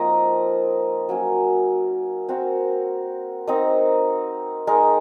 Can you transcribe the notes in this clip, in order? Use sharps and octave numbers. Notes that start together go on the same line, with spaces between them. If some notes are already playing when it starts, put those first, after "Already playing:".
Already playing: F3 A#3 C4 D#4 F4 A#4 D#5
F#3 A#3 C#4
C4 F#4 A#4 F5
C4 D#4 A#4 D#5
G#3 D#4 A#4